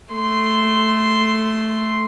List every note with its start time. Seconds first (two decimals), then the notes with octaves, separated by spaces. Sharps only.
0.12 A3 C6